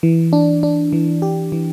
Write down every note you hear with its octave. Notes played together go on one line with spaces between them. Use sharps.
E3
D4
D4
E3
G4
E3